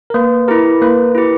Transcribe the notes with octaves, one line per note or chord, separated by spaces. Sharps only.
A#4
A#3 B4
E4 G4 A#4
A#3 B4
E4 G4